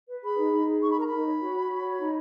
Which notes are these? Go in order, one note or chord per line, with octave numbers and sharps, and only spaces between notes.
B4
G#4 B5
D#4
D#4
G#4
D#4 C#6
B5
A#4 A#5
B5
D#4
C#5
F#4
C#5
F#4
C#5
D#4